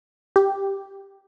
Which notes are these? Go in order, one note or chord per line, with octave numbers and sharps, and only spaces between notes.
G4